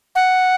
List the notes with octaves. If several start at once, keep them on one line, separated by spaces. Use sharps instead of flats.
F#5